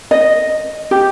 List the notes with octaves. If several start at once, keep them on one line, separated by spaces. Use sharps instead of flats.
D#5
G4